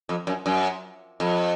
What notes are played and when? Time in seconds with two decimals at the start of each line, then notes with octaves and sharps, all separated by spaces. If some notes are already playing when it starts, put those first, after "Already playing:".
0.09 F2
0.27 F#2
0.46 F#2
1.20 F2